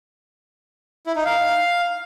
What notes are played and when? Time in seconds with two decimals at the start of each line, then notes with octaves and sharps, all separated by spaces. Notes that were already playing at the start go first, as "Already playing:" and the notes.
1.06 E4
1.16 D#4
1.25 F5